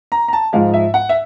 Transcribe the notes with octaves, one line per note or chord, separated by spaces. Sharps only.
A#5
A#5
A5
G#2 F3 G#3 F5
E5
F#5
E5